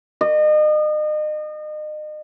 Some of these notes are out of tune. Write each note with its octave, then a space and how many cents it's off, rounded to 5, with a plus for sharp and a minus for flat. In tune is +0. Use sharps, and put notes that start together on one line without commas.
D#5 -35